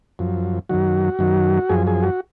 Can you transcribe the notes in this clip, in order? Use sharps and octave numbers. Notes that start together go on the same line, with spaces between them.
F#2 F3
F#2 D#3 F#3 F#4
F#2 D#3 F#3
F#2 F3 G#4
G#4
F#4